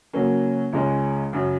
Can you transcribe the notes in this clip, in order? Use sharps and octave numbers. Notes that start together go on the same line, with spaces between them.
C#3 F#3 A#3 C#4
C#2 C#3 G#3 C#4
F#2 C#3 F#3 C#4